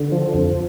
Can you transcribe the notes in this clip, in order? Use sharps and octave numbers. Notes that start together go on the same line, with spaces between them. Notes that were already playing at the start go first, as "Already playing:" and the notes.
Already playing: D3
F3
F2